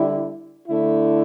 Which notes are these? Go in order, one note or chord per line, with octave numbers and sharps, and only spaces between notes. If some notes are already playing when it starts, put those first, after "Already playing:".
Already playing: D3 G3 E4
D3 A3 E4